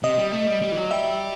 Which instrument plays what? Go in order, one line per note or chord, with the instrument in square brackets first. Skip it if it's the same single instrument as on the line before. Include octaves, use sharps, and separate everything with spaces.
[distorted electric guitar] C3 [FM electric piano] D#5
[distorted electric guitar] G3
A3
G3
G3
E3
F#3
[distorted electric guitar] G3 [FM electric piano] E5